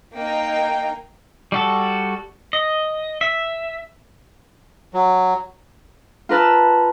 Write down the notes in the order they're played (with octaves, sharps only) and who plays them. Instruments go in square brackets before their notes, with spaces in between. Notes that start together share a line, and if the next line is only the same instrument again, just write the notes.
[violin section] A#3 D#4 G5
[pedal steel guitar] G3 F#4 A4
D#5
E5
[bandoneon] F#3
[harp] F4 A#4 B4 A5 E6